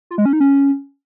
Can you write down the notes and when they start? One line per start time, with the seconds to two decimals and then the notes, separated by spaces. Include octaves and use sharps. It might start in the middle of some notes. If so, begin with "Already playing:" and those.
0.11 F4
0.18 G#3
0.25 C#4
0.33 D#4
0.40 C#4